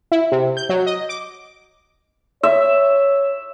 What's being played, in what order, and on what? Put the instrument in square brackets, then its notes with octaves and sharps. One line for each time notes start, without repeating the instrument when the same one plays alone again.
[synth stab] E4
C3
G6
F#3
D#5
D6
[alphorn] C#5 [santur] E5